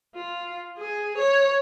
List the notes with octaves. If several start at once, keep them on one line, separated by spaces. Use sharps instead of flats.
F4
G#4
C#5